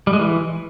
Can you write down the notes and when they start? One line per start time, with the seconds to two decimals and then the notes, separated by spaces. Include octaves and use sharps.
0.07 G3
0.13 G#3
0.19 E3